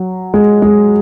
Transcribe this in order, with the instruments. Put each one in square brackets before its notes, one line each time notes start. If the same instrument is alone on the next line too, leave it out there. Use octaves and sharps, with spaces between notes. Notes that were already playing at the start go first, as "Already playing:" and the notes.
Already playing: [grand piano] F#3
G#3
G#3